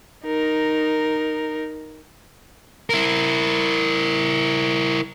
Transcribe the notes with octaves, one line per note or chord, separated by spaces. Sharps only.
D#4 A#4
E4 A#4